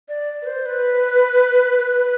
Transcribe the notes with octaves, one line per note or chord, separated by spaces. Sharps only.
D5
B4
C5
B4
B4